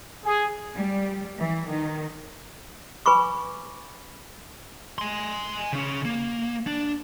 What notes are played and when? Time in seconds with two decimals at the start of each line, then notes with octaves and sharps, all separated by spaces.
0.25 G#4
0.77 G3
1.38 E3
1.70 D#3
3.06 B4 G#5 B5 C#6 D6
4.98 G#5 C6
5.73 C#3 C#4
6.05 A#3
6.67 D4